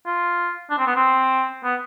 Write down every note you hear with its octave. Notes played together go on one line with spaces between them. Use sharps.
F4
D4
C4
B3
C4
B3